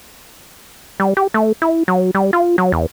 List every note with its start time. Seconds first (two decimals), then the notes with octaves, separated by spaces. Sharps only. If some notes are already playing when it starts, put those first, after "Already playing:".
1.00 G3
1.17 G4
1.34 A3
1.62 E4
1.88 F#3
2.15 G3
2.33 F4
2.58 F#3
2.72 E2